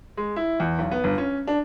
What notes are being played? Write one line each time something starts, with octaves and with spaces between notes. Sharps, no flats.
G#3
E4
E2
B1
B3
G1
C#4
D4